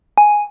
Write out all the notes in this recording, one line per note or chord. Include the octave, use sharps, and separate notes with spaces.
G#5